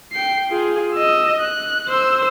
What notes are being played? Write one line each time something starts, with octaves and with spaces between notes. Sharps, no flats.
G5 C7
F4 G#4
D#5 E6
F#6
C5 E6